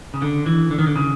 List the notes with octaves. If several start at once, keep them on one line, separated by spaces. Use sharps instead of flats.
C#3
D3
E3
D3
D#3
D3
C#3